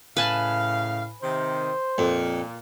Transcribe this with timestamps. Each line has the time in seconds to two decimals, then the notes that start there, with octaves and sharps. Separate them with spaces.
0.17 A2 C#3 A3 B4 F5 G#5 A5
1.22 C3 D#3 C5
1.98 F2 A#2